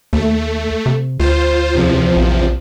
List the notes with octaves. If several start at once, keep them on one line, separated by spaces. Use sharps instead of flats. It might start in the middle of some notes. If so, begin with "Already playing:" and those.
D#2 A3
C3
D2 F4 C5
E2 C3 F3
A#1